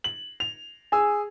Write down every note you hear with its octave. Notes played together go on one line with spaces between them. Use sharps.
F#7
F7
G#4 G#5 E6